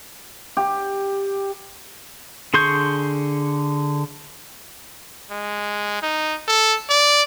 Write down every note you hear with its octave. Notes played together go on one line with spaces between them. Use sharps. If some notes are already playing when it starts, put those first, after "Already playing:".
G4
D3 G#4 C6 C#6 G6
G#3
D#4
A4
D5